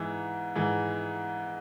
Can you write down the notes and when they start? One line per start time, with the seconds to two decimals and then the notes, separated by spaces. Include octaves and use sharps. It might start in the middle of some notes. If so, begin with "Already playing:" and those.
Already playing: G#2 E3
0.56 G#2 E3